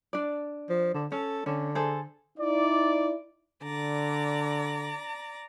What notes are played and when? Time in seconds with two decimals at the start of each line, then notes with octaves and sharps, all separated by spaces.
0.13 D4 D5
0.69 F3
0.94 D3
1.12 C#4 A4
1.46 D3 C#4
1.75 G#4 A4 C5
2.38 D#4 E4 D5
3.63 D3 D5 A#5